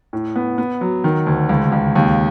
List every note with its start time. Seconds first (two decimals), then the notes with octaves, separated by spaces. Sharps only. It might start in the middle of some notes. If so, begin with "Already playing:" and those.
0.13 A2
0.36 B3
0.58 B3
0.81 F#3
1.04 D#3
1.26 D2
1.49 C#2
1.72 C#2
1.95 D#2